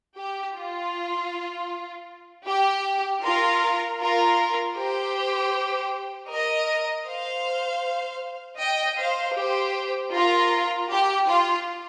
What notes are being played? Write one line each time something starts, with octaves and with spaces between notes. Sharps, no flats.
G4
F4
G4
F4 A#4
F4 A#4
G4 C5
A#4 D#5
C5 F5
D#5 G5
C5 F5
G4 C5
F4 A#4
G4
F4